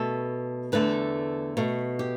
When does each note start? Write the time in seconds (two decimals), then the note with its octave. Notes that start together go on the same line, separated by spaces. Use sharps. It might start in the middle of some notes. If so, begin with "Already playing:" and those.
Already playing: B2 A3 A4
0.72 E2 D3 A3 B4
1.57 B2 A3
1.99 G4